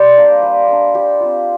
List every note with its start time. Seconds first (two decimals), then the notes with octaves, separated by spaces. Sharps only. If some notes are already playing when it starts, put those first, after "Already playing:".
Already playing: G3 C5 D5
0.17 A#3 D4
0.42 G3
0.68 A#3 D4
0.95 G3 G4
1.20 C4 F4